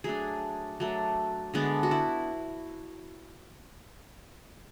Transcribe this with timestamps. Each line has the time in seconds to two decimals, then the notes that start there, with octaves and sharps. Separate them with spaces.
0.04 F#3 A3 D4 G#4
0.80 F#3 A3 D4
1.54 D3 G#3 B3 D4
1.83 F#4
1.91 E4